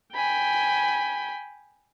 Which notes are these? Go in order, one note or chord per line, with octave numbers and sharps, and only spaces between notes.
G5 G#5 B5